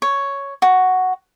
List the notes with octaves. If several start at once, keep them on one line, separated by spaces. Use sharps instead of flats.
C#5
F#4